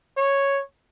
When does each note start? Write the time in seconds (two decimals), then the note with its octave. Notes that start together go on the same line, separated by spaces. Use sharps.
0.17 C#5